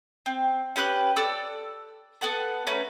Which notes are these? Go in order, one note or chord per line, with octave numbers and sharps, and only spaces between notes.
C4
C#4 G4 B4 F#6
A4 D5 E6 F#6
B3 A4 F#5 A5
A3 C#4 B4 A#5